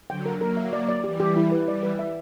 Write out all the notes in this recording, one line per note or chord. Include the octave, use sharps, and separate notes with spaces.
D3 F#3 G5
A#4
F#3 A#3 A#4
E5
D5
D5
E3 G3 G4
G4
E4
B4
E3 G3 D5
B4
E5